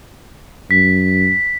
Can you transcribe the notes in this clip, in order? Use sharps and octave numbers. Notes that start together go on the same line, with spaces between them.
F#2 B6